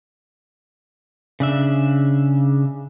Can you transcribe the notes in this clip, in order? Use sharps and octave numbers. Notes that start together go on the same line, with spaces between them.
C#3 D4 E5